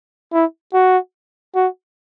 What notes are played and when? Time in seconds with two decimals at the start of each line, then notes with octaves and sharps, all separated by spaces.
0.33 E4
0.73 F#4
1.55 F#4